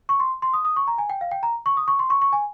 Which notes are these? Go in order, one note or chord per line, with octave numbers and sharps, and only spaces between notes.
C#6
C6
C6
D#6
D#6
C#6
A#5
G#5
G5
F5
G5
A#5
C#6
D#6
C#6
C6
C#6
C#6
G#5